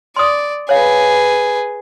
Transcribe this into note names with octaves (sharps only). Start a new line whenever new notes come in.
D5 C6 D#6
G#4 B4 C#5 F5